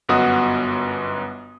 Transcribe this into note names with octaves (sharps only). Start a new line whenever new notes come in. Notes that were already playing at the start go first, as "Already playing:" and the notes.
G1 F#2 B3 F#4 D#5 D#6